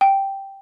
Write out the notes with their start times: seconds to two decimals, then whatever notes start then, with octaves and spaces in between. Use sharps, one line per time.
0.01 G5